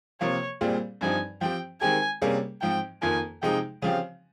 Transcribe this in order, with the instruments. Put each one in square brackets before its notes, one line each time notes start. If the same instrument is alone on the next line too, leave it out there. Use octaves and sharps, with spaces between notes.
[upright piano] C3 F3 A#3 [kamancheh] C#5
[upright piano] A#2 G3 C4 F4 G#4
[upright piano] G2 F3 C4 D#4 G4 [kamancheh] G#5
[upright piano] F3 C4 G4 [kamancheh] G5
[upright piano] D#3 G#3 C4 G4 [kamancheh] G#5
[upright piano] C3 G3 A#3 C#4 G#4
[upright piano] G#2 F3 C4 [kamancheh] G5
[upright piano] F2 D#3 A#3 F4 [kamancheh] G#5
[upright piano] C3 F3 G#3 D#4 G#4 [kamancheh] G5
[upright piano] C#3 F3 C4 G4 [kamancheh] F5